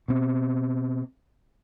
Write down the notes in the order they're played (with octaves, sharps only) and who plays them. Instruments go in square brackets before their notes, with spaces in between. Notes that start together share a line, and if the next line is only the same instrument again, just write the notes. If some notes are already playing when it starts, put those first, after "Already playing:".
[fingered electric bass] B2 C4